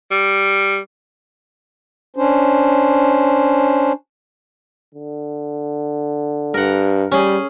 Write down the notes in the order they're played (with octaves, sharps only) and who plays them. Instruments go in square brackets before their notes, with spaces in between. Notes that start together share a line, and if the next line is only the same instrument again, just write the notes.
[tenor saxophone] G3
[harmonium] C#4 D4 C5
[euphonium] D3
[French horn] G2 [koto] A#4 F#5
[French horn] G3 [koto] C#4 G#4